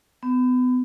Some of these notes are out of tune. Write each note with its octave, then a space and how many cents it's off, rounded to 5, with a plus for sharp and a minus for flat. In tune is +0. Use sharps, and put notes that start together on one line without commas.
B3 +30